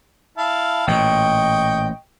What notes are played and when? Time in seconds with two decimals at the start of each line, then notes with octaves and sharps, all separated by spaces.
0.38 E4 F5 A5
0.87 A1 A#2 D#5 G5 C#6